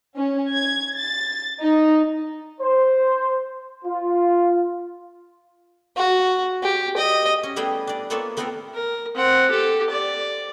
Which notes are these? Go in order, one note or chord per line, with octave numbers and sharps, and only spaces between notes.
C#4
G#6
A6
D#4
C5
F4
F#4
G4
D#5
C#4
G3 A3 B3 E4 G#4 G5
D4 D5
A#3 B3 F4 A4 C#5 E5
A3 B3 C4 F4 A4 A#4
A#4
C4 F#5
G4 A4
D5